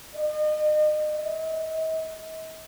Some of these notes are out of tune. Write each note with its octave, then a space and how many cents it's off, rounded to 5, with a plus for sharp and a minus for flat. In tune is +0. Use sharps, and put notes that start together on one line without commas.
D#5 -35
D#5 +45